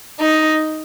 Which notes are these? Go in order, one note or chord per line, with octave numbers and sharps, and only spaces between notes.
D#4